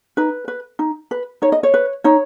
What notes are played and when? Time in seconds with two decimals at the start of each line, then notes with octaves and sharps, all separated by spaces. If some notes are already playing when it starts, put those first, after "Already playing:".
0.17 D#4 B4
0.48 B4
0.79 D#4
1.11 B4
1.42 D#4 C#5
1.52 D#5
1.63 C#5
1.74 B4
2.04 D#4 C#5